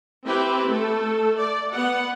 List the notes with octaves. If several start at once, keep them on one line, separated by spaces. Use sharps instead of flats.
C4 E4 G4 B4
A3 A4
D5
B3 F#5